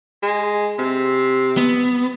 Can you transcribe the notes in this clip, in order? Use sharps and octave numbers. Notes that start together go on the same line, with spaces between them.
G#3
C3
B3